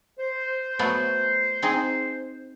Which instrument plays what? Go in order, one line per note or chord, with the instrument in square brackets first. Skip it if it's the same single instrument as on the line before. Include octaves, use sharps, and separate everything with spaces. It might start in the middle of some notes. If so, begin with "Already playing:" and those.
[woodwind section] C5
[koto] F#3 A3 B3
C4 D#4 G#4